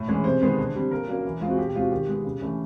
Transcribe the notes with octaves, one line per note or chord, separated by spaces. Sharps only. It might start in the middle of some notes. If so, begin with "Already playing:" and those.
Already playing: A2
E3 G#3 C#4
C3 C5
D#3 G#3 B3
D3
G3 C4
A#2 A#4
F#3 A#3 C#4
E3
G#3 C4 F4 F#4
B2 G4
G4
G#3 C4 F4 F#4
D#3 G4
G#3 B3
C#3
E3 A3 C#4